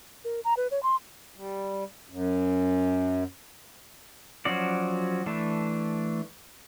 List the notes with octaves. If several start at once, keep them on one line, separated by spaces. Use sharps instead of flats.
A#4
A#5
B4
C#5
C6
G3
F#2
F3 F#3 C#4 F#4 D5
E3 A3 D4